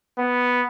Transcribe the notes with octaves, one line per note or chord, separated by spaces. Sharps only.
B3